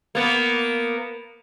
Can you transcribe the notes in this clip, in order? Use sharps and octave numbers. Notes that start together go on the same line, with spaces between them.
A#3 B3